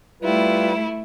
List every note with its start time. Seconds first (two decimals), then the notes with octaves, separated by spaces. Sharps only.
0.22 G3 A3 E4 F4 B4